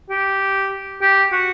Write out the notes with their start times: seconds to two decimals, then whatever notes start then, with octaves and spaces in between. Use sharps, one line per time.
0.10 G4
1.02 G4
1.32 F#4